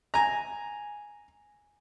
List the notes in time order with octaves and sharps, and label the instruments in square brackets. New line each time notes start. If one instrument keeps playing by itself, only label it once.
[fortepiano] G#5 A#5